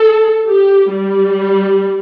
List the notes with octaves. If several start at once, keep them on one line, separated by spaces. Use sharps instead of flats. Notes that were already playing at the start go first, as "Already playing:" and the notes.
Already playing: A4
G4
G3